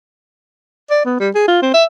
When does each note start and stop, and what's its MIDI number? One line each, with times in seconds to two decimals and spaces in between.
0.90 1.02 74
1.06 1.18 59
1.20 1.30 55
1.35 1.44 68
1.48 1.61 65
1.63 1.74 60
1.74 1.85 76